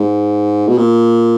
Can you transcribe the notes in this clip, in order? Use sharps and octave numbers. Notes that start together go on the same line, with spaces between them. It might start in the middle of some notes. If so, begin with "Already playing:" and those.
Already playing: G#2
B2
A#2